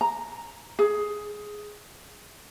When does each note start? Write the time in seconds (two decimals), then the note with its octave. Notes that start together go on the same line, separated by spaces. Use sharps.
0.01 A#5
0.79 G#4